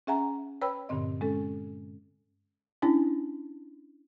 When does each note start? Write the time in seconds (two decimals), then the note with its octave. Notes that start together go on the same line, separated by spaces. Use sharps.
0.07 C#4 G#4 E5 F#5 G#5 A#5
0.62 B4 C#5 G5 B5 E6
0.89 G2 A#2 D3 C4 D#5
1.21 G#3 C#4 A4
2.82 C#4 D4 E4